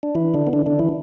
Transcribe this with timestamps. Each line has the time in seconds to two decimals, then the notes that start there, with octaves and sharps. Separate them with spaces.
0.03 D4
0.15 E3 E4
0.34 D3 D4
0.47 B3
0.53 D3 D4
0.66 D3 D4
0.79 E3 E4